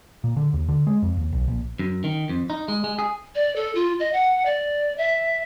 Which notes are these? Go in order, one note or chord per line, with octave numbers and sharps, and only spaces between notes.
A#2
D3
D#2
D3
G#3
F2
D#2
B1
A#1
F#2
D#3
F2
D#4
G#3
G#3
G#4
D5
A4
F4
D#5
F#5
D5
E5